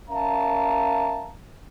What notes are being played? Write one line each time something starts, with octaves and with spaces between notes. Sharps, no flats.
C#4 A#4 E5 F5 A5 A#5